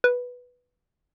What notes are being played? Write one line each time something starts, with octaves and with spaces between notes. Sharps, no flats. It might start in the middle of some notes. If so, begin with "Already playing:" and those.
B4